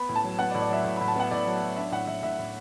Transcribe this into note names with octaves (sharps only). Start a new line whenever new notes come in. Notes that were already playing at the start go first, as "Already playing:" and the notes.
Already playing: B3 B5
A2
A5
F#3
B3 F#5
D5
A2
D5
F#3 E5
A2
A2 B5
A5
B3 F#5
A2 D5
F#3
F#3
D4 E5
A2 F#5
A2 E5
A2 E5
A2